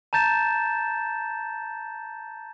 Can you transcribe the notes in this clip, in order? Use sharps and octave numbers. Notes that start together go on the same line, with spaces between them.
A5 A#5 G6 A6 E7